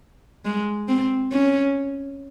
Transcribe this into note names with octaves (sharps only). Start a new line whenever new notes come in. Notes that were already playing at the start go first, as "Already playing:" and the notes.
G#3
C4
C#4